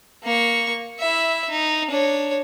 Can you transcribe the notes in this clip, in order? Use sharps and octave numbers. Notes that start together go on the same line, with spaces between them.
A#3 C#6
E4 E5
D#4
D4 C#5